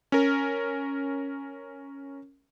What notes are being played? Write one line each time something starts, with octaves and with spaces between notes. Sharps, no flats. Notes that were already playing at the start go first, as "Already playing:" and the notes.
C#4 A#4